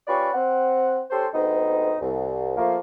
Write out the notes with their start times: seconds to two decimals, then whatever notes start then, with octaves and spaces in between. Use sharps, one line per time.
0.07 C#4 F4 G4 B4 D5 C#6
0.34 C4 F#5
1.10 C#4 G4 A4 C5
1.34 D2 G#2 B3 C4 D#4
2.01 C2
2.57 F3 A3 A#3